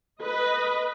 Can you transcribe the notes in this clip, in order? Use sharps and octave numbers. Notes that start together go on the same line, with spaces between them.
B4 D#5